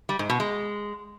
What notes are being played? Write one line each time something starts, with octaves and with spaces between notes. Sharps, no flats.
G3
G#2
B2
G#3